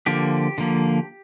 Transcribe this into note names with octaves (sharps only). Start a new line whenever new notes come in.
D3 F3 A#3 G4
D3 F3 A#3